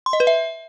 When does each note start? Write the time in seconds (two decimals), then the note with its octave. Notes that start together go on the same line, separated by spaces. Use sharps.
0.06 C6
0.13 D#5
0.20 B4
0.27 E5